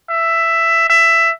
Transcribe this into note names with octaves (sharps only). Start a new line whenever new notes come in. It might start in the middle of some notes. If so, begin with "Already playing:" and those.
E5
E5